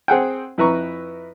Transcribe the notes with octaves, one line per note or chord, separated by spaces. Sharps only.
C4 G#4 F#5 G5
F2 E4 B4 A#5 C#6